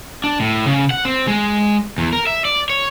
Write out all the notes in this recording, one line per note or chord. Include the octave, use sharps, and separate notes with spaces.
D4
A2
C#3
F#5
C4
G#3
E2
A#4
E5
D5
C#5